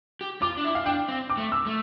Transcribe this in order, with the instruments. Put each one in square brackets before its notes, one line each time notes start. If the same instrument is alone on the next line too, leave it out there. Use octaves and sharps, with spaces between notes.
[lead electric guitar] G4
[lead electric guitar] F4 [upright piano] D6
[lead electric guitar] D4
E4
[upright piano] F5
[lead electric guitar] D4 [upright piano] G5
[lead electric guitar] C4
[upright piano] D6
[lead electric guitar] A3
[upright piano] E6
[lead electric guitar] A3